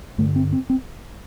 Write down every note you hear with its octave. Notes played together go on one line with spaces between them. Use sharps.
G2 D3 A3
C4
C4
C4